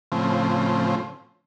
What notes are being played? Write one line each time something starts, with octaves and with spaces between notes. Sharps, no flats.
A2 C#3 F3 C4